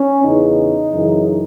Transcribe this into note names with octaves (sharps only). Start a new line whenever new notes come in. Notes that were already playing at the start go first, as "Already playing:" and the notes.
Already playing: C#4
E2 C#3 E3 D#4
F#2 C#3 E3